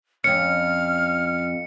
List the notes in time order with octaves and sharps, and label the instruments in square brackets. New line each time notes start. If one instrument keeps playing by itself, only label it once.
[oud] F2 C#4 [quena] F6 [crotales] C#7